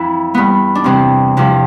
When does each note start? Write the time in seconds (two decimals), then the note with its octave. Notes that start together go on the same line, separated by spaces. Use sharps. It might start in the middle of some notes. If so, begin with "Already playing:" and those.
Already playing: F2 E3 E4
0.34 G2 E3 B3
0.75 D4
0.84 E2 C3 E3 C4
1.37 E2 C3 F3